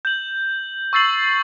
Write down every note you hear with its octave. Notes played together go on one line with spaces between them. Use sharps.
G6 F#7
C#6 E6 A6 C7 F#7